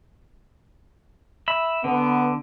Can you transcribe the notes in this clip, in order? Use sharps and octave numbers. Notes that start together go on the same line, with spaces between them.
E5 B5
D3 B3